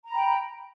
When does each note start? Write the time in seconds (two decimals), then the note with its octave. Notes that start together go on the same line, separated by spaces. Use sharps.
0.06 A#5
0.10 B5
0.15 G5